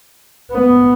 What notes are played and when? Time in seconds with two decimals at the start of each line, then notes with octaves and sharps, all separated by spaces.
0.51 B3